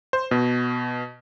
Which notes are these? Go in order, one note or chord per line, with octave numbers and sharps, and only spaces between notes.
C5
B2